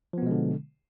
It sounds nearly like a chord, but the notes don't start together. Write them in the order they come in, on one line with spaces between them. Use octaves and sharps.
F3 B3 B2 G#3 D3